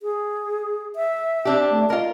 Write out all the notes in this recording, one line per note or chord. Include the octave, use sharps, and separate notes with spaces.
G#4
E5
C4 D4 G4
A3
F4 A#4 D#5